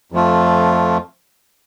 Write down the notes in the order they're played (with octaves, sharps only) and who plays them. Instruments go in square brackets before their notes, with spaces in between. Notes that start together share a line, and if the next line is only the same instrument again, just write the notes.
[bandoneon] F2 F3 A3 F4